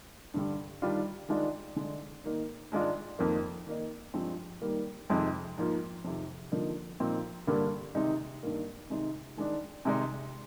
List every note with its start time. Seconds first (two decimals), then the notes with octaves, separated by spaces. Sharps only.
0.34 G2 D3 G3
0.82 D#3 G3 D4 F4
1.29 D#3 G#3 D4 F4
1.76 D3 G#3 D4
2.24 G#2 D#3 A#3 D#4
2.72 G#2 D#3 G#3 D4 F4
3.19 F2 D#3 A#3
3.67 D#3 A#3 D#4
4.14 G2 F3 G#3 C4
4.62 D#3 G3 A#3
5.10 F2 C3 D#3 G#3 C4
5.58 G#2 F3 A#3
6.04 F2 C3 D#3
6.52 D3 F3 A#3 D#4
7.00 A#2 F3 C4 D#4
7.47 G2 D3 G3 A#3 D4
7.95 C3 D#3 G#3 D#4
8.43 G2 D#3 A#3
8.90 C3 D#3 G#3 D#4
9.37 D#3 G#3 D4
9.85 C3 D#3 G#3 D#4